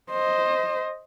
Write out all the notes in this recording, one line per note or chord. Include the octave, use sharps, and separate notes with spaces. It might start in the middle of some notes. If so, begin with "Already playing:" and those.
C5 D#5